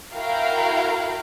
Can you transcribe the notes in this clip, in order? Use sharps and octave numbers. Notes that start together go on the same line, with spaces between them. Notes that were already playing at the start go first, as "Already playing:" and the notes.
E4 F#4 A#4 F5 G5